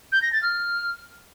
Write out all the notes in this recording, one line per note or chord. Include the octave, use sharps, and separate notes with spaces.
G6
A#6
A6
F6